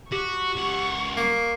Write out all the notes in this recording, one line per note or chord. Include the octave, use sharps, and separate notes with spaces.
F#4 G4 C#6
C#2 F#5
A#3